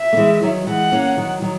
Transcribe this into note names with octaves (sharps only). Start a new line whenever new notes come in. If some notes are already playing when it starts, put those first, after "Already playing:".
Already playing: E5
A#3
E3 G#3
D#3 F#3
E3 G#3 F#5
A#3 C#4
D#3 F#3
D#3 F#3